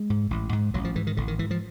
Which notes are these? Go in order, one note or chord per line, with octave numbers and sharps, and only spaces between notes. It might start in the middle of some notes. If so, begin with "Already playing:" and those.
Already playing: G#3
G#2
A1
G#2
A1 F#3
F3
G#2 E3
D#3
A1 D3
D#3
G#2 E3
F3